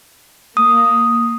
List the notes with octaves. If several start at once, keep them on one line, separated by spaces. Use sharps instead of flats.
A#3 D#6